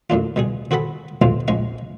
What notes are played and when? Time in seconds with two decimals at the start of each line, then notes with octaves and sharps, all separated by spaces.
0.10 F#2 A2 D4 F4
0.36 B2 G3 G#4
0.71 C4 F#4 G#4 A4 F#5 B5
1.22 F2 G#2 B2 C4 F4
1.48 A#1 G#2 G#3 C#4 C#6